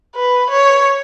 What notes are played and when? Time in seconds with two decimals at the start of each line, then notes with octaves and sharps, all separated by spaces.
0.16 B4
0.51 C#5